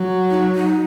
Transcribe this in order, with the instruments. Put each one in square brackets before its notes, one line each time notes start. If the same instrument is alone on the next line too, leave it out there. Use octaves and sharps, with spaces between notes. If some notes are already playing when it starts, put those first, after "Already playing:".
Already playing: [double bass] F#3
[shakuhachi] D#4
D#4